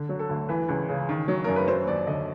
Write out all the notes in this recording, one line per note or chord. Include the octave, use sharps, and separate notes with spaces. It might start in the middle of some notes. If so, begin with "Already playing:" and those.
Already playing: D3
F#3
A4
D2
E3 B4
C#2
C#3
D#3
F#3
F#2 A#4
B4
F#3 C5
D#2 D5
D3 D#5